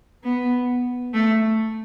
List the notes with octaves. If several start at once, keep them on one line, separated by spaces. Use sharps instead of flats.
B3
A3